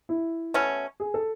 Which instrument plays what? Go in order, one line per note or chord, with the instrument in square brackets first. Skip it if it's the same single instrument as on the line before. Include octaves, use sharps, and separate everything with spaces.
[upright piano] E4
[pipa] B2 A3 C#4
[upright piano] G#4
A4